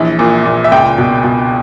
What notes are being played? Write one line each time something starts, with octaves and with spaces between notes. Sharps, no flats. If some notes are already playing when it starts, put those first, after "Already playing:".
Already playing: A#1 E3
A#2
A#2
E5
C#2 G5
B2
B2